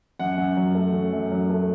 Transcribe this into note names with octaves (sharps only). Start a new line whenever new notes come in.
F#2 F#5
F#2
F#3
A3
F#2
F#2
F#3
A3